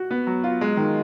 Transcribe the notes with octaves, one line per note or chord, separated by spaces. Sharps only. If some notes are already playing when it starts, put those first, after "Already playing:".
Already playing: F#4
B3
F#3
F4
G#3
D#3